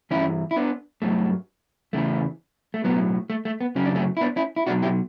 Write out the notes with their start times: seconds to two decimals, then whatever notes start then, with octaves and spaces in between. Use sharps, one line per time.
0.11 G2 E3 C#4 E4
0.51 E4
0.56 B3 D4
1.02 G2 F#3 A3
1.93 E2 C#3 E3 A3
2.74 A3
2.84 B1 A2 F#3 B3
3.30 A3
3.45 A3
3.61 B3
3.75 F#2 C#3 F#3 C#4
3.85 D4
3.95 A3 C#4
4.17 E4
4.21 B3 D4
4.36 C#4 E4
4.56 E4
4.67 B1 B2 F#3 D4 F#4
4.82 E4 G4